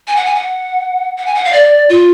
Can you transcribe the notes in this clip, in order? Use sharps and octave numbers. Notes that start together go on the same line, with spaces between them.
G#5
F#5
G#5
F#5
F#5
G#5
F#5
F5
D5
F4